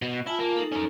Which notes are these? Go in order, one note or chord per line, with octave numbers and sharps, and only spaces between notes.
B2
E4 F4 G#5 A5
A#3
D#4 A4
C#4 A#4